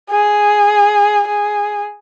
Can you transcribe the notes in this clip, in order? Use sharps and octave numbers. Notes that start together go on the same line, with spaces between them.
G#4
G#4